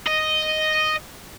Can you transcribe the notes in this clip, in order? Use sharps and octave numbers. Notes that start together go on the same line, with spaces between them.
D#5